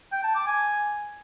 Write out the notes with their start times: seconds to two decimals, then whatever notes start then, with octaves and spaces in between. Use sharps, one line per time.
0.12 G5
0.24 A5
0.35 D6
0.47 G#5